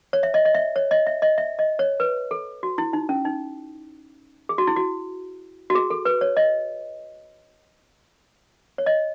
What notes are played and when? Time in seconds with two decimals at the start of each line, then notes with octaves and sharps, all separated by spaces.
0.13 C#5
0.23 E5
0.34 D#5
0.45 D#5
0.55 E5
0.76 C#5
0.91 D#5
1.07 E5
1.22 D#5
1.38 E5
1.59 D#5
1.79 C#5
2.00 B4
2.31 A4
2.63 F#4
2.78 E4
2.93 D#4
3.09 C#4
3.25 D#4
4.49 G#4
4.58 F#4
4.67 E4
4.76 F#4
5.70 F#4
5.75 G#4
5.90 A4
6.05 B4
6.21 C#5
6.37 D#5
8.78 C#5
8.86 D#5